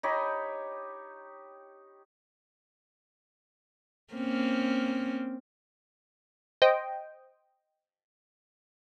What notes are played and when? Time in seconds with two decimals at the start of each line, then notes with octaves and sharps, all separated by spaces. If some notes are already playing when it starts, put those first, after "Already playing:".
0.03 D#4 G4 C#5 B5
4.14 A#3 C4 C#4
6.62 C5 D#5 G5